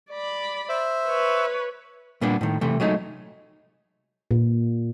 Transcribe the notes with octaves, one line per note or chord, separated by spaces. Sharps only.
D5 B5
C5 E5
B4 C#5
A#2 G3 A#3 B3 D4
A2 D#3
C3 E3 A3
F#3 G#3 A3 D#4
A#2